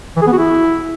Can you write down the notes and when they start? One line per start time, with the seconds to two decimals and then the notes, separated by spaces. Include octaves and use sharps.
0.16 E3
0.22 G#4
0.27 B3
0.32 F#4
0.38 E4